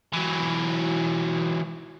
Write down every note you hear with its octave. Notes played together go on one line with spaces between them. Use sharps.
E3 F#3